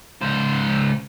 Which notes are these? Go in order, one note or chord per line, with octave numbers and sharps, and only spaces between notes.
C#2 C5